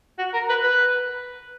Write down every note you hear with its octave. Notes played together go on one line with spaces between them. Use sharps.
F#4
A#4
B4
B4